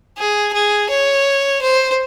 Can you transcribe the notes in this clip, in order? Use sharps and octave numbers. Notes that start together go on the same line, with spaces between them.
G#4
G#4
C#5
C5